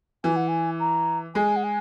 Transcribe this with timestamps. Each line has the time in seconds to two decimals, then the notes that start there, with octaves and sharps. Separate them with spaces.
0.24 E3 G#5
0.36 F#5
0.48 G#5
0.80 A#5
1.35 G#3 G#5
1.56 F#5
1.64 G#5